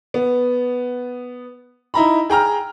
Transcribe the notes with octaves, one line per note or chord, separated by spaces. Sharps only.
B3
D#4 E4 A#5 B5
G#4 G5 A#5 F6